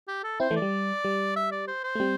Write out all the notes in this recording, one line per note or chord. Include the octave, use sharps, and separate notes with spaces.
G4
A4
C4 E4 C5
E3 A3
D5
G3
G3
E5
D5
C5
C5
A3
G3 C4